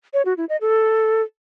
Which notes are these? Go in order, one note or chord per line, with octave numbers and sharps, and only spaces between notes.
C#5
F#4
E4
D#5
A4